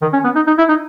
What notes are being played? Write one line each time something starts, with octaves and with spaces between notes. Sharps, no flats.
D#3
C#4
B3
D#4
D#4
E4
D#4